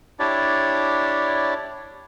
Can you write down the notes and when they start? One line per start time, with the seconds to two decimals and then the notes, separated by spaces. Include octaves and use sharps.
0.19 D4 E4 G4 C#5 D5